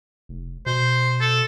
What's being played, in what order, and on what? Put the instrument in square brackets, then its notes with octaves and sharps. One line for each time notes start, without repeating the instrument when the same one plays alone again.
[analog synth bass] F1
[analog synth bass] B2 [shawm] C5
[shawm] A4